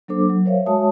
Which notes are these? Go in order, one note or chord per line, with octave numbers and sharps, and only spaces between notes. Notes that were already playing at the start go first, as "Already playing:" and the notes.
F#3 A#3 D4 A4 C5 D6
F#3
A#4 C5 C#5 E5 F5
G#3 F#4 C#5 E5 A5 D#6